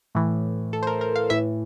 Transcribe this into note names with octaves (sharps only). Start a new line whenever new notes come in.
A2 E3
A4
C5
A#4
A#4
F5
A2 E3 E5